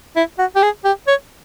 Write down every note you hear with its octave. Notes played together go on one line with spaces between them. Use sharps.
E4
F#4
G4
G#4
G4
C#5